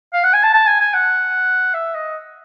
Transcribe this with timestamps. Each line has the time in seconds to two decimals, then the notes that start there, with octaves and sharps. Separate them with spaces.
0.13 F5
0.24 F#5
0.34 G#5
0.43 A5
0.54 A5
0.67 G#5
0.80 G#5
0.94 F#5
1.74 E5
1.95 D#5